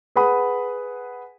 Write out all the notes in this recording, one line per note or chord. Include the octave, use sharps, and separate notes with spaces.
G#4 B4 F#5 B5 D#6